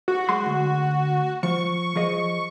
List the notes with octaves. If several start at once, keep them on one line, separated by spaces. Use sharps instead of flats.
F#4
F#2 G#3 C6
D2
F3 C#6
F3 G#4 D#5